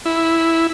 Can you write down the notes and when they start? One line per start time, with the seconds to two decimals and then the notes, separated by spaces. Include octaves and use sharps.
0.05 E4